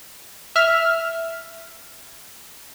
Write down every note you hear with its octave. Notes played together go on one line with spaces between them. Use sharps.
E5 F6